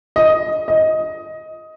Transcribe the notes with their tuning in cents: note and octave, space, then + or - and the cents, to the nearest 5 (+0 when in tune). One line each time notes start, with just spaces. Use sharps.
D#5 +10
D#5 +15